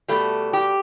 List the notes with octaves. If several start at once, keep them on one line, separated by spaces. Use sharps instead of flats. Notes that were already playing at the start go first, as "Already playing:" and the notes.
B2 G3 A3
G4